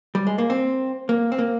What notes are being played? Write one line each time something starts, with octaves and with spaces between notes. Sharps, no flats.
G3
G#3
A#3
C4
A#3
C4
A#3